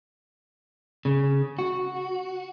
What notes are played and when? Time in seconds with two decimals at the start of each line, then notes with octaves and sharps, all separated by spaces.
1.05 C#3
1.59 F#4